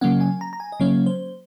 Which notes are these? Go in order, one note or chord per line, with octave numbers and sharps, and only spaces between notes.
C#3 F#3 A#3 C#4 F#5
G#5
A#5
A#5
G#5
D#5
C#3 F#3 A#3 C#4 C#5
C5